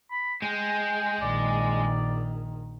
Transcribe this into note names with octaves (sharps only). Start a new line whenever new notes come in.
B5
G#3 G5
A#1 D#3 D5